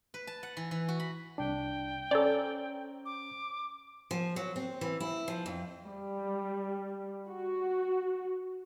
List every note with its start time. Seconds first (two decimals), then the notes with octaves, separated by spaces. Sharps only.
0.14 B4
0.27 A5
0.43 F#5
0.57 E3
0.71 E3
0.88 F#4
1.00 B5
1.38 C2 D4 G5
2.11 C#4 A4 C5 D5 A#5
3.05 D6
4.11 F3
4.36 F#3
4.56 C4
4.81 E3
5.00 E4
5.28 F3
5.46 F2
5.85 G3
7.28 F#4